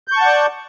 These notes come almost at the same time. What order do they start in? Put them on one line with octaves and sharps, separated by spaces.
G6 C#6 A5 F#5 D5